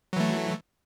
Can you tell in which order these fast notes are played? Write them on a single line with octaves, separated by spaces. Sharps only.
F#3 E3 A3